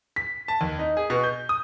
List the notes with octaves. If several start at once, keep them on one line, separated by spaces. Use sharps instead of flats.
B6
A5
D#2
D#4
G#4
B2
G6
D#6